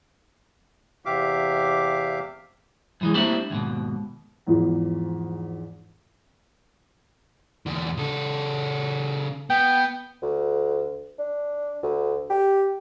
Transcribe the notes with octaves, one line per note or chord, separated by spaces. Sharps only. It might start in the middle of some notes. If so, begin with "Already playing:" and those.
E2 C3 G4 E5 F5 D6
F#2 E3 G#3
G3 A3 A#3 C4 D4 E4
D#2 G#2 B2
E2 G#2 E3 F3
E2 D3
C#3 A4
B3 G5
D2
D4
D2
G4